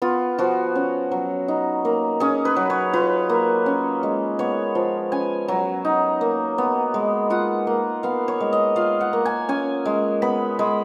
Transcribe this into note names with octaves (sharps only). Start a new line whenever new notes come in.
B3 F4
F3 F#4
C#4
F#3
D#4
A#3
C#4 G#4
B4
F#3
C#5
F4 B4
A#3
C#4
G#3
B3 C#5
F3
C#4 G#5
F#3
D#4
A#3
B3
G#3
F4 F#5
A#3
B3 F5
C#5
G#3
D#5
F4 F5
F#5
A#3
G#5
C#4 G#5
G#3
B3 B5
G#3 B5